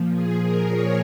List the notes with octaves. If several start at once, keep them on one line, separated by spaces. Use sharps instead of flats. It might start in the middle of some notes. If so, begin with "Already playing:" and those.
Already playing: A#2 F3
G#4
A#4
C#5